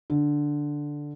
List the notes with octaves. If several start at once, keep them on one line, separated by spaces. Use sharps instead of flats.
D3